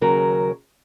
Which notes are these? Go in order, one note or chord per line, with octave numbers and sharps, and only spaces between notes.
D#2 C#3 F#3 A#4